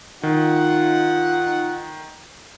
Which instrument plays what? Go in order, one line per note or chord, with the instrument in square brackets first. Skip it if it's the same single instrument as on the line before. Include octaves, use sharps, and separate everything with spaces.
[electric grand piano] D#3 [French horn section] D#4 F4 [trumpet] F#5